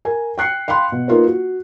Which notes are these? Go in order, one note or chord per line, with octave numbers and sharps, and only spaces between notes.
A#4 G#5
G5 F#6 C7 C#7
F5 G5 B5 C6 F#6
B2
A#3 D#4 F4 A#4 B4
F#4